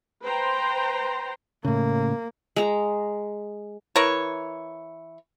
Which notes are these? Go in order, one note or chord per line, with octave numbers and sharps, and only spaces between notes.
B4 C5 G5 A#5 C6
A2 C#3 A#3
G#3 A#5
E3 A#4 C#5